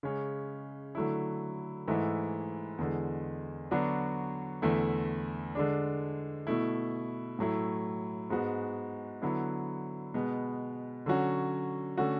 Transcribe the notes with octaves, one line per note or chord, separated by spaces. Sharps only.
C#3 G#3 C#4
D3 F#3 A3 E4
G#2 E3 A3 E4
E2 D3 G#3
D3 F#3 B3 D4 F#4
E2 D3 A3 E4
D3 G#3 D4
B2 A3 E4
A2 F#3 A3 E4
G#2 G#3 B3 F#4
D3 F#3 B3 E4
B2 G#3 B3
D3 F#3 C#4 F#4
D3 A3 C#4 F#4